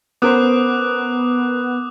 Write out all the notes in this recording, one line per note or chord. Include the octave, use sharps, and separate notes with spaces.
B3 C#4 A#4 C5 D6 D#6 F#6